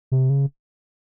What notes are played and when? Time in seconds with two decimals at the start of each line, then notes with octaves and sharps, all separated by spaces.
0.12 C3
0.30 C#3